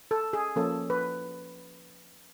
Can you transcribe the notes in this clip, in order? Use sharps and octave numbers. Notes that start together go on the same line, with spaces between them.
A4
G#4
F3 A#3 C#4 A4
B4